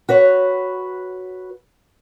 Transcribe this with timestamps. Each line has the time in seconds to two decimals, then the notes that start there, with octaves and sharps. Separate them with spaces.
0.09 F#4 B4 C#5